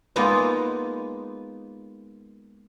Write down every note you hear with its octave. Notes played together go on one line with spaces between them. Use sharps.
G#3 A#3 B3 D#4 F4 D#5